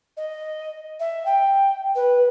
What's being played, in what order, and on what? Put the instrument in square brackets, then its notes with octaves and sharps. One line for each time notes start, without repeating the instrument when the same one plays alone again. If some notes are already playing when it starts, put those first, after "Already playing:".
[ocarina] D#5
E5
G5
B4